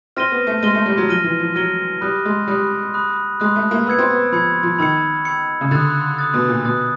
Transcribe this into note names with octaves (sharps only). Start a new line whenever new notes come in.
C4 F6 A#6 D#7 G7
B3
A3
G#3 F6 A#6 D#7 G7
A3
G3
F#3
F3 F6 A#6 D#7 G7
E3
F3
F#3 F6 A#6 D#7 G7
G3 B5 D#6 F#6
G#3
G3 B5 D#6 F#6
B5 D#6 F#6
G#3 B5 D#6 F#6
A3
A#3
B3 B5 E6 G#6 C#7
C4
B3
F3 B5 E6 G#6 C#7
F3
D#3 B5 E6 G#6 C#7
B5 E6 G#6 C#7
C#3
D3 D#6 F#6 A6
D#6 F#6 A6
B2
A#2
B2 D#6 F#6 A6